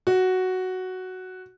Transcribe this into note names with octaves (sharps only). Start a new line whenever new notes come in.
F#4